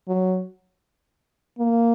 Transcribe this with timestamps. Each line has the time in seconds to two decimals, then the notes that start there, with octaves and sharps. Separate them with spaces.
0.08 F#3
1.59 A#3